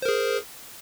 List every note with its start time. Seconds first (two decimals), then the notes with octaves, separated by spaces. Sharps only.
0.02 C5
0.05 A#4
0.09 G#4